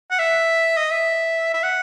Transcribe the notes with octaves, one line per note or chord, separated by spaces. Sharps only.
F#5
E5
D#5
E5
E5
F#5